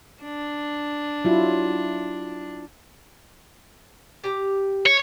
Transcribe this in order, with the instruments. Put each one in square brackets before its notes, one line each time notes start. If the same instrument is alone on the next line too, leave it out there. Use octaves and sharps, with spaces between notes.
[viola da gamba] D4
[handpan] F#3 E4 F4
[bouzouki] G4 A#5
[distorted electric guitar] C#5